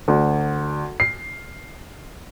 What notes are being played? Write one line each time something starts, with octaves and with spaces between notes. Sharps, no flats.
D2
C7